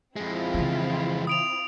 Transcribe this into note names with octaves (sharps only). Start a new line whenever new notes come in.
F2 G#3 C4 E4 F4
C#3 E3
D#6 D7 F7